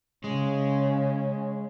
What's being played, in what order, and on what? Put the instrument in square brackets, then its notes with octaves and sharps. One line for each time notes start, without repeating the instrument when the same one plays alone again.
[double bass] C#3 C#4 [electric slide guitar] G#3